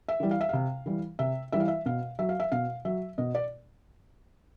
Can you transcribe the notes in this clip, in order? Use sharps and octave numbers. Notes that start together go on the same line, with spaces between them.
E5
E3 G3
F5
E5
C3 F5
E3 G3
C3 E5
E3 G3 E5
F5
E5
B2 F5
F#3 E5
F5
E5
B2 F5
F#3 E5
B2 D#5
D5